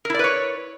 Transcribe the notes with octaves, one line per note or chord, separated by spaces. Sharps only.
E4 A#4 B4 C#5 D5